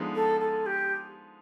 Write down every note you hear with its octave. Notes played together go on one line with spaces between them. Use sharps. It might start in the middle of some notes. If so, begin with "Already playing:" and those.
Already playing: D3 F3 G#3 B3 D#4
A4
A4
G4